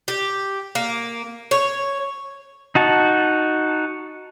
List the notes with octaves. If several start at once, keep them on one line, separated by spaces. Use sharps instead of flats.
G4
A#3
C#5
D#4 F#4 A5